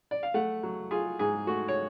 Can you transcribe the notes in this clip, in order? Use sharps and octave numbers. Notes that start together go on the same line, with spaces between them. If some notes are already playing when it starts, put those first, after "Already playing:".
D5
F5
A3 F#5
F#3
F4 G#4
G#2 G#4
A3 F#4
C#5